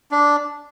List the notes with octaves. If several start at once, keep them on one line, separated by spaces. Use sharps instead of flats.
D4